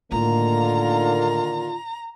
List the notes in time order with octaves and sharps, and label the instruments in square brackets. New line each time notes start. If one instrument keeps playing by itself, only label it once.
[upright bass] A2 [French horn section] D3 D#3 A#3 [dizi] F4 [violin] A#5